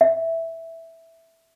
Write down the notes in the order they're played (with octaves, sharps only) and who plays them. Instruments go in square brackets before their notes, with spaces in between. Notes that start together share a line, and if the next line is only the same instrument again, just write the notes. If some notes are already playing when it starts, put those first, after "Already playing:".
[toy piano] E5